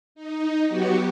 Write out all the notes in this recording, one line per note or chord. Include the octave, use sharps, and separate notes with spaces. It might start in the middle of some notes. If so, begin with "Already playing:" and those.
D#4
F#3 B3 F#4 G4